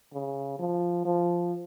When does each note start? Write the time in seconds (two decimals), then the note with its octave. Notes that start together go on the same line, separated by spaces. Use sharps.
0.13 C#3
0.59 F3
1.05 F3